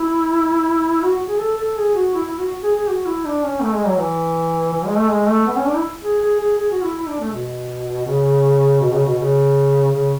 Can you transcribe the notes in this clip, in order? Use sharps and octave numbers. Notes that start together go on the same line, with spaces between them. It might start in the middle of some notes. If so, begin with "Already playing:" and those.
Already playing: E4
F#4
G#4
A4
A4
G#4
F#4
E4
E4
F#4
G#4
G#4
F#4
E4
D4
C#4
A3
G#3
F#3
E3
E3
G#3
A3
G#3
A3
B3
C#4
D4
E4
G#4
G#4
G#4
G#4
F#4
E4
E4
D4
A3
B2
C#3
B2
C#3
B2
C#3
C#3